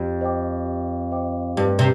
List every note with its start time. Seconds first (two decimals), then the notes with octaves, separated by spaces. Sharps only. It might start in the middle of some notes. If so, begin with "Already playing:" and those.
Already playing: F2 G4
0.21 C5 D#5 G5 D6
0.66 G4
1.12 C5 D#5 G5 D6
1.57 G2 G4
1.79 C3